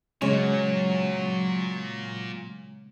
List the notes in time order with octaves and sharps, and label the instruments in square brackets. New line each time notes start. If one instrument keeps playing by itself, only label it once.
[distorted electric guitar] A#2 [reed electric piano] C#3 G#3 C#4 [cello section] F#3 [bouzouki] C#5